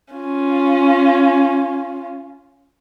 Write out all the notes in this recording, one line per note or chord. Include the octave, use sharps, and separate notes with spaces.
C#4 F4